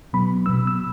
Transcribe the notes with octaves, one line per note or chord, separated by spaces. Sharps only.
B2 F#3 B3 B5
B2 F#3 B3 E6
E6